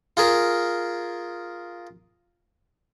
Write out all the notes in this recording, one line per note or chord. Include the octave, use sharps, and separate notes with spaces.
F4 G#4 A#4